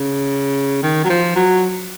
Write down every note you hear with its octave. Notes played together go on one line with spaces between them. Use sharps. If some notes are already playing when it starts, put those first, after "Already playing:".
Already playing: C#3
D#3
F#3
F3
F#3